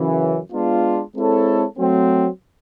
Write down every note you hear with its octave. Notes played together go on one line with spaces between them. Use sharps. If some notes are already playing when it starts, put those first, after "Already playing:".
Already playing: F#2 C#3 E3
G#3 B3 D4 F4
G#3 C4 E4 A4 C#5
F#3 A3 C4